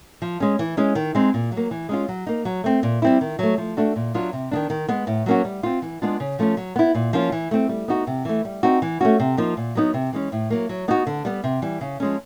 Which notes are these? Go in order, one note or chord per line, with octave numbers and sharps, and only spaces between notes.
F3
G#3 C#4
E3
G#3 C#4
D#3
G#3 C4 D#4
A#2
F#3
A#3
E3
G#3 C#4 F4
F#3
A#3 D#4
F#3
A3 C4
A#2
G3 C4 E4
D#3
F#3 A3
F3
A3 D4 F#4
A#2
F#3 B3 D4 F4
C3
D#3 F#3 B3 D4
D#3
G#3 B3
A2
F#3 A#3 C#4 F#4
G3
C4 F4
E3
G#3 B3 D4 F4
C#3
F3 A3 C#4 F4
F#3
B3 E4
A#2
F3 A#3 C#4 F4
E3
A3 C4
G3
B3 D#4 F#4
C3
E3 A3
G3
C4 D#4 F#4
E3
A3 C#4 F#4
C3
F3 A#3 D#4
A#2
F#3 B3 D#4
C3
E3 G#3 C#4
A2
F#3 A#3
F#3
B3 D#4 F#4
D3
G3 B3
C3
E3 G3
C#3
F3 G#3 C#4